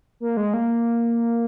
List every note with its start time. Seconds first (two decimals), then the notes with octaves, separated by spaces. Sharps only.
0.20 A#3
0.37 G#3
0.54 A#3